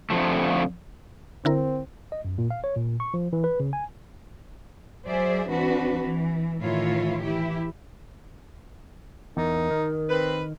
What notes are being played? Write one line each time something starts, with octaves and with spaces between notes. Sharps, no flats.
F2 D3 F3 A3
D3 C4 E4 A#4
D#5
F#2
A#2
F5
C#5
A#2
C#6
F3
E3
B4
C#3
G#5
F#3 G#4 C5 D5 E5
E3 C4 D4 F#4 B4
E3
A2 D#3 E3 E4 F4 C#5
E3 E4 G4
E2 D#4 A#4
D#3
C4 B4